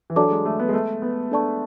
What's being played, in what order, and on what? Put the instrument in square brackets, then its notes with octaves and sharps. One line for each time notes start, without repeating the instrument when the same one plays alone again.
[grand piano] E3
[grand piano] F#3 [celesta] D4 A4 D5 A5 D6
[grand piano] G#3
A3
B3
G#3
A3
B3
[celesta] D4 A4 D5 A5 C#6